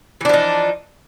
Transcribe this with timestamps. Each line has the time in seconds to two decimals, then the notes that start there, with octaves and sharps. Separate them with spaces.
0.21 E3
0.25 D4
0.29 F3
0.34 D#4